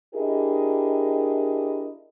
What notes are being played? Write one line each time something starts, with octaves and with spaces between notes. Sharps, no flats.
D4 E4 G4 G#4 A#4 D#5